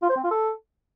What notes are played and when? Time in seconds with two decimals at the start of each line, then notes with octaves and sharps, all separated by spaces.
0.02 F4
0.10 C5
0.17 C4
0.24 F4
0.31 A4